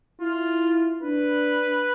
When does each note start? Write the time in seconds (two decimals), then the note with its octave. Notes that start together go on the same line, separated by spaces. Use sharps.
0.21 E4 F4
1.02 D4 B4